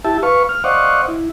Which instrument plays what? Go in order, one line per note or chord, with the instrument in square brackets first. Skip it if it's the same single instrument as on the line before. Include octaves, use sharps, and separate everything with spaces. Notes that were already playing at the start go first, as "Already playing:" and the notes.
[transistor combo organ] E4 G4 E5 A5
B4 F5 C#6
F6
C5 D5 D#5 F5 F#5 C#6
E4